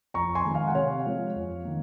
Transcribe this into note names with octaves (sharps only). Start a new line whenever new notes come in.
F2 A#5 C#6
G#5 C6
D#3 G#3
F5 G#5
F#5
C3 C#5 F5
F3 G#3
F2
D#3 A#3